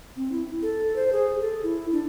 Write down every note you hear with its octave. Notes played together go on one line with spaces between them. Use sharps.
C4
E4
A4
C5
G#4
A4
E4
D4